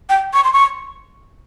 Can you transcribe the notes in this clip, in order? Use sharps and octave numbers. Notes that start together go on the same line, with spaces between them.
G5
C#6
C6
C#6